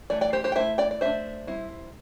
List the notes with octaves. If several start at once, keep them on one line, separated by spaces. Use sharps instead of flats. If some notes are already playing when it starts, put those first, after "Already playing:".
E3 A3 D5
D5 G5
G4 C5
G4 C5
G5
A3 E4 C5 E5
D5 G5
D5
A3 D4 C5 E5
G3 C4 E4